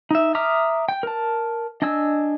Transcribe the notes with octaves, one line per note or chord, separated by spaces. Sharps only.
D#4 E5
E5 A#5 D6 D#6 F6
G5
A#4 A5
D4 D#5 G#5 E6